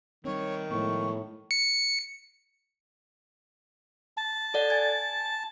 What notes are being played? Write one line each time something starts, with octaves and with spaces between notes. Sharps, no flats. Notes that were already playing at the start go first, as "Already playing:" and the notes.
D#3 G3 C4 C#5
A2 F3 G#3 B3 C#6
C#7
A5
A4 D5 F#5
G#5 G#6 A6